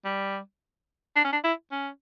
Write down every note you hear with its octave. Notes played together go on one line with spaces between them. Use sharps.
G3
D4
C#4
D4
E4
C#4